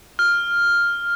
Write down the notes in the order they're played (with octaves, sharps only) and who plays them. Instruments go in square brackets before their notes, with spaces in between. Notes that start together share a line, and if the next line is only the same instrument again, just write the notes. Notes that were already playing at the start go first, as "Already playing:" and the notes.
[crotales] F6